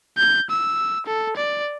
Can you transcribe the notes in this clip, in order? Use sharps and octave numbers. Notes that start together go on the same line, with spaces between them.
G6
E6
A4
D5